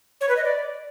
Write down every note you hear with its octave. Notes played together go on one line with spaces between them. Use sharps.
C#5
B4
D#5
D5